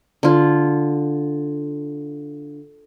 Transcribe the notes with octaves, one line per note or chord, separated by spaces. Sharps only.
D3 F4